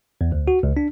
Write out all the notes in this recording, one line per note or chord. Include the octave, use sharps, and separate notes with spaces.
E2
D2
F#4
C#2
D4